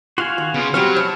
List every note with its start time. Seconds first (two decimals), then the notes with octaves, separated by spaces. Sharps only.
0.18 F4 F#4 F5 G#5 C6
0.38 D#3
0.54 C#3 B3 F4
0.74 F#3 G3 C4 C5 F6
0.97 E3 C5 A5